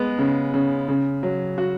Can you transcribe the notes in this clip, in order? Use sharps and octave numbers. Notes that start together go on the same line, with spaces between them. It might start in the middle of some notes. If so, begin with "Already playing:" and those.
Already playing: G#3 B3
C#3
C#3
C#3
F#3
F#4